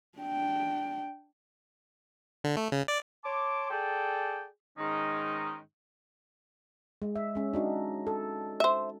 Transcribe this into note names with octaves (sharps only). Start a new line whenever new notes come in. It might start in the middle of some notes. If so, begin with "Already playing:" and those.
D4 G5
D3
A3
C#3
D5
C#5 A5 C6 D6
G#4 A4 D5 G5
G#2 D#3 G#3 C#4 D#4
G#3
E5
G#3 C#4
D4 D#4 F#4
A4
C5 E5